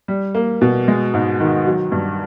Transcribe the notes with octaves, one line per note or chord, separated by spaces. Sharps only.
G3
A#3
B2
G#3
G#2
D#3
F#3
G2